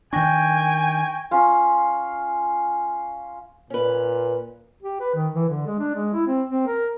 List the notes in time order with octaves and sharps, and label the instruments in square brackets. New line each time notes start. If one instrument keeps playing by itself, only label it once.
[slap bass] D#3 D4 [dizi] G5 [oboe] G#5 [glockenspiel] C#6 A#6
[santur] C#4 F4
[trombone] A#2 [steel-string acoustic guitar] C#4 B4
[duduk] G4
B4
D#3
E3
D3
G#3
D4
G#3
E4
C4
C4
A#4